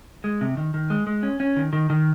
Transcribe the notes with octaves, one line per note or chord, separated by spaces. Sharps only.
G#3
C3
D#3
D#3
G#3
G#3
C#4
C#4
D#3
D#3
D#3